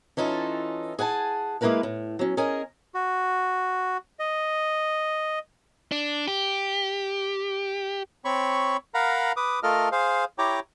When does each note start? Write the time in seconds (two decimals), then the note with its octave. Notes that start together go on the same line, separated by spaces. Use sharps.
0.17 E3 C#4 D#4 F4 A4
0.99 G#4 F#5 G#5 A5
1.61 G#3 A#3 E4 A#4 B4 F5
1.83 A2
2.19 F#3 C#4
2.37 C#4 G#4 A#4 D#5 G#5
2.95 F#4
4.19 D#5
5.92 D4
6.28 G4
8.25 C4 C#5 B5 C#6
8.94 A#4 F5 F#5 A#5 B5
9.37 B4 D6 D#6
9.63 A3 F4 A4 A#4 D#5 F6
9.92 G#4 C5 F5
10.39 E4 G4 C#5 G5 A#5 D6